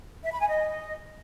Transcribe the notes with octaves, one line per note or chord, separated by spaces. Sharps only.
E5
B5
G#5
D#5